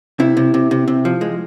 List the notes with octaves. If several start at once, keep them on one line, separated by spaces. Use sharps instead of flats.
C3 E4
C3
C3
C3
C3
F3
G#3